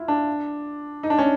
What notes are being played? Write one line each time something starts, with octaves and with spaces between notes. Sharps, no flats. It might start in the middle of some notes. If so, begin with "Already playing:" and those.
Already playing: E4 F4
D4
D#4
D4
C#4